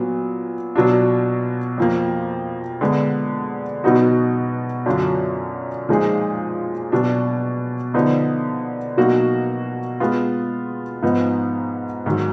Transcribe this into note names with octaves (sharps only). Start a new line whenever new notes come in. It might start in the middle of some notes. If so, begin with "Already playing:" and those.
Already playing: A#2 F#3 B3
B2 F#3 D4 F4
F2 F3 A#3
D3 G#3 B3
B2 F#3 B3 D#4 F#4
F#2 D3 F#3 D4 F4
A#2 F3 G#3 D#4 G#4
B2 F#3 D4
D3 F3 B3 D#4
B2 F#3 A#3 D#4 F#4
G#3 B3 F4
G#2 F3 B3 D#4
G#2 D#3 F#3